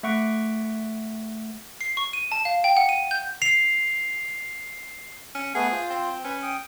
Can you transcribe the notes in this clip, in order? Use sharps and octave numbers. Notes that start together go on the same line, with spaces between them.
A3 E5 F#5 C#6 F#6 D7
C7
C#6
D#7
A5
F5
G5
F#5
D#7
G6
C7 F7
C#4
A3 B3 G#4
F4 C5
C4
C#4 B4
G5 D#6